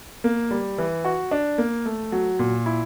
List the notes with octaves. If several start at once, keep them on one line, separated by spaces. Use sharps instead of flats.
A#3
G3
E3
F#4
D4
A#3
A3
F#3
A#2
E4